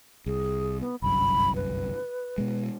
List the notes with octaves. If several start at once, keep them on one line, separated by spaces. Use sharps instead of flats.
C2 G#4
B3
G1 C2 F#2 B5
B4
B2 G#3